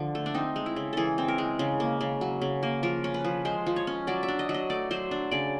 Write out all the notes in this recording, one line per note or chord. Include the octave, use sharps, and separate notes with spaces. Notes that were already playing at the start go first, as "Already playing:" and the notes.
Already playing: D3 F3
A3
D4
C4 D#4
G#3
E4
C#3
E3 G#4 A4
C4
A#4
G#3
C#3
A#3
C#3
F#3
C#3
A#3
F3 A#4
C#4
B4
F3
G#3 C5
F3
C#5
C#4
F#3 D5
E5
D4
D#5
F#3
D#5
A3 D5
F#3 C5
D4
C#3 D5